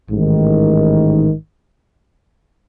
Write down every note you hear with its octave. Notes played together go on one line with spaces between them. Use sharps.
A1 G#2 D#3